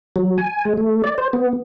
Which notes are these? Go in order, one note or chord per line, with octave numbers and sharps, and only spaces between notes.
F#3
G#5
G#3
A3
D5
C5
B3